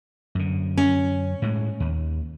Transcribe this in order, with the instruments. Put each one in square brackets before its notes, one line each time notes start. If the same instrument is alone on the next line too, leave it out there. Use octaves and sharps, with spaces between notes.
[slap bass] F#2 D3
[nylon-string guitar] C#4
[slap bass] A2 G#3
D#2